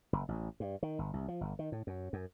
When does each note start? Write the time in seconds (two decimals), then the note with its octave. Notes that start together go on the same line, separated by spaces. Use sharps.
0.13 F#1
0.28 A1
0.60 G2
0.83 D#3
0.99 G1
1.13 C2
1.28 F3
1.41 G1
1.59 D#3
1.72 A2
1.87 F#2
2.13 F#2